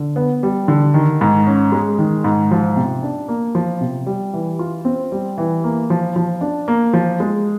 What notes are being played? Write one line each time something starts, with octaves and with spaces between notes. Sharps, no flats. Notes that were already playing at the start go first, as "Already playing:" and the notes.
Already playing: D3
B3
G3
D3
D#3
G#2
C#4
G#3
D#3
G#2
F3
C3
D4
A#3
F3
C3
G3
E3
F4
C4
G3
E3
A#3
F3
F3
D4
A#3
F3
G#3